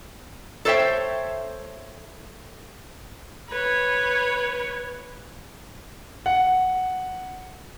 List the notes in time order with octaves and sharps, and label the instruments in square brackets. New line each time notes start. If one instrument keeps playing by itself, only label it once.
[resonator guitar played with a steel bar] A4 C5 C#5 E5 G5
[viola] B4 C#5
[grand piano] F#5